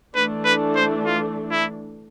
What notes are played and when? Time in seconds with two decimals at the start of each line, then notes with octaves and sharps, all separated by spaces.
0.15 E3 A3 D4 B4
0.45 B4
0.76 C5
1.05 F4
1.51 E4